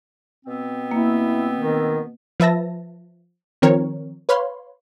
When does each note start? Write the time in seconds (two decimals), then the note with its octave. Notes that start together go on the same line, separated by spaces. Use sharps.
0.45 B2 B3 C4
0.91 A#3 E4
1.58 D#3
2.40 F3 B4 E5 A5 A#6
3.62 D#3 F3 C4 A#4 C#5
4.29 B4 C#5 F5 B5 C6